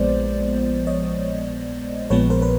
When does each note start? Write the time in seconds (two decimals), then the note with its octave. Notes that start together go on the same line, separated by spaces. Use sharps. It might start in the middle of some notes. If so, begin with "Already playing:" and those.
Already playing: A#1 A#2 F3 G#3 B3 C5 D5
0.87 C#5 D#5
2.10 A#1 A#2 F3 G#3 B3 B4 C#5
2.30 A#4 C5
2.42 B4